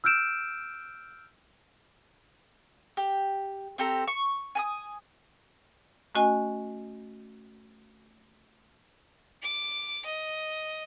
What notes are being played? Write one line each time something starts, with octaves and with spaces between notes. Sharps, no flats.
E6 F6 G6 D7 E7
G4
C4 G4 A4 A#5
C#6
G#5 B5 D#6
A3 C#4 F#4 D#5 G#5
D6
D#5